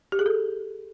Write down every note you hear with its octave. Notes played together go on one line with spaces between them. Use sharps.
G4
G#4
A4